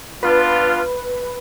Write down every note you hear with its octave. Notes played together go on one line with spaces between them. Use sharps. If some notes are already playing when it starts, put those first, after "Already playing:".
B3 D4 F4 B4